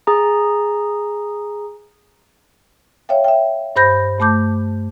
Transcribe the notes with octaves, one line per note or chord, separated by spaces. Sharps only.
G#4 A#5
C#5 E5 F5 G5
E5 G5
G2 C5 B5 G6 A#6
G2 A3 A5 D6 G6